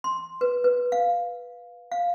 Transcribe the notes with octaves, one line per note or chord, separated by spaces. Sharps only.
C6
B4
B4
F5
F5